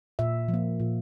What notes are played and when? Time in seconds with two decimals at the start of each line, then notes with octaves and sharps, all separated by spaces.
0.19 A#2 E5
0.48 F3
0.54 A#3
0.80 A#2